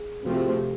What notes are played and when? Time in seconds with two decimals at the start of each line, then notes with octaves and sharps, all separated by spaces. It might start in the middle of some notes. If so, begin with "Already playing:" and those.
Already playing: G#4
0.24 C3 F3 A3 C4 F#4
0.35 G4
0.46 G#4
0.57 G4